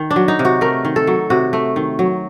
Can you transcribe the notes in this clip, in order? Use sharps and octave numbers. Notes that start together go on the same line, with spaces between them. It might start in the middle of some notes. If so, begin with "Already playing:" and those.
Already playing: D#3
D4
F#3
D#4
C3
F#4
A3 A#4
D#3
A4
F#3
C3 F#4
A3
D#3
F#3